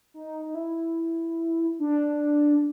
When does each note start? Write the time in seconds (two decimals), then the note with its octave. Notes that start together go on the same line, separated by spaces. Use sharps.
0.14 D#4
0.45 D#4
0.55 E4
1.79 D4